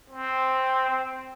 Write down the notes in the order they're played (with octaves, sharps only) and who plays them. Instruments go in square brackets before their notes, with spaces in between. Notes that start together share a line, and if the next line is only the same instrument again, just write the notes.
[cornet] C4